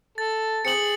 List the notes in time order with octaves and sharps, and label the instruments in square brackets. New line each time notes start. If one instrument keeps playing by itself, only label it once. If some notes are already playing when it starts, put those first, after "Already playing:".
[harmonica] A4 [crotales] A6
[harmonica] C4 G#4 [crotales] C#7 F#7